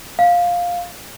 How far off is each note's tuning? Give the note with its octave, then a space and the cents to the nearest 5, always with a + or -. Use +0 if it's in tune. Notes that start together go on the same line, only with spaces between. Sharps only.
F5 +10